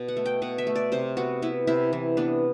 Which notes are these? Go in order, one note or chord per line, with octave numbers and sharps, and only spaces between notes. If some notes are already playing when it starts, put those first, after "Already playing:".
Already playing: B2
F#5
A3
G5
B2 F#5
E5
A3
D5
C3 C5
B3 F#4
B3 E4
C3 E4
E3
B3 D4